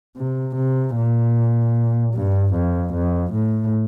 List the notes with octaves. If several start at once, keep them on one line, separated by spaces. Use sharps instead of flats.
C3
C3
A#2
G2
F2
F2
A2